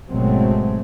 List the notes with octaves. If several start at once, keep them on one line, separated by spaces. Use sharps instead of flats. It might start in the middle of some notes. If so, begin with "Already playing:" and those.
G#1 B2 F#3 G#3 A3 C4